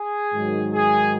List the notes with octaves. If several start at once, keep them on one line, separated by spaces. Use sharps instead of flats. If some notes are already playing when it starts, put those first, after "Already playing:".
Already playing: G#4
G#2 D#3 F#3
G#4